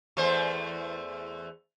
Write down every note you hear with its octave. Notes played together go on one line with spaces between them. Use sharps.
E2 A3 C5